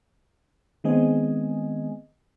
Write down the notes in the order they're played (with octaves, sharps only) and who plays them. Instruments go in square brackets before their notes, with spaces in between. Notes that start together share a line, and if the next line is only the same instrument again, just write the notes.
[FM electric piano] D#3 G#3 B3 C4 D#5 G#5